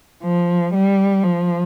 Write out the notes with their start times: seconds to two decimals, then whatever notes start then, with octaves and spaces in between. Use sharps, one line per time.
0.23 F3
0.74 G3
1.23 F3